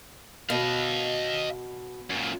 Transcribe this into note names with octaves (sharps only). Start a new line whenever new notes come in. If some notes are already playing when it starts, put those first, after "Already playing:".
B2 D#5 F5
F#2 A#2